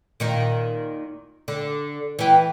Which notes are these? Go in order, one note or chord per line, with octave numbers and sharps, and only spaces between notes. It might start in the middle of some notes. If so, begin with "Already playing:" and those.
A#2 D#3 D#4
D3
E3 G4